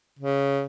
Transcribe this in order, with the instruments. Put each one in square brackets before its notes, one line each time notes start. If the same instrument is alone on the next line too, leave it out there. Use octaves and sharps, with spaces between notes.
[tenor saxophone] C#3